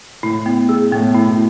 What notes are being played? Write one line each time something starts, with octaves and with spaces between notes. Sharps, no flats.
A2 E4
B3
G#4
A2 B3
E4
B2